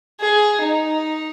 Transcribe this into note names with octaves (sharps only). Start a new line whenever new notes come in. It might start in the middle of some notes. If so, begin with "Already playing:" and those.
G#4
D#4